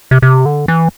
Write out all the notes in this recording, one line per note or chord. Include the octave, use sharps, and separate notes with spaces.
C3
C3
D3
E3